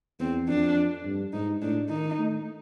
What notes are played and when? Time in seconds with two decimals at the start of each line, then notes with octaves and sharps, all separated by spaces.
0.20 E2 C4
0.49 F2 D4
1.05 G2
1.33 G#2 D#4
1.62 A2 D4
1.89 D#3 D#4
2.18 A3